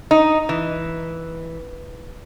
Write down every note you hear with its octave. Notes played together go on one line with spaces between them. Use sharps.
D#4
E3